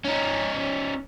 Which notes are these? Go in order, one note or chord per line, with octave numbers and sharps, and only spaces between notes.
C#4 D#4